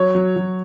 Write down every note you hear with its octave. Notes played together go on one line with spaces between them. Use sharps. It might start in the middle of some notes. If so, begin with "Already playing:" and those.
Already playing: F#3 C#5
F#3
F#3